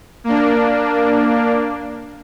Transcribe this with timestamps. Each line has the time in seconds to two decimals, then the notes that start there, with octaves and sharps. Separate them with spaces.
0.24 A#3 D4